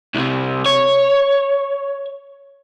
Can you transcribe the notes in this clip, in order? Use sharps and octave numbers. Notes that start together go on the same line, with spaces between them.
C2 C3
C#5